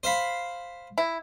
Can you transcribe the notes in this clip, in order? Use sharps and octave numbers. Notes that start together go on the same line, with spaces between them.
C5 F5 B5
E4